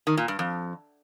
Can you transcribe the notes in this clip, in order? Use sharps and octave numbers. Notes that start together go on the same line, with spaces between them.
D#3
A#2
G2
F2